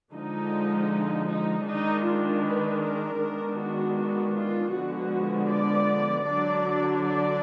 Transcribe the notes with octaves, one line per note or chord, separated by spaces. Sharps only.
D3 F3 G#3 D#4
D#4
D#3 G#3 D4 D#4
F4
B4
A#4
D#3 G#3 B3 D4
F#4
F#4
F4
D3 F3 G#3 B3 F#4
D5
D3 F#3 D4 D5
D5